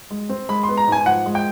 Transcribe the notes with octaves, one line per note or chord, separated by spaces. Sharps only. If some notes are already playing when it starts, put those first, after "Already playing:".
G#3
C4
G#3 B5
C6
B3
A#5
G#2 G#5
F3 F#5
G#3
G5